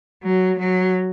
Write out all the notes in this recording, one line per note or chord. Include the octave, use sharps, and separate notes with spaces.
F#3
F#3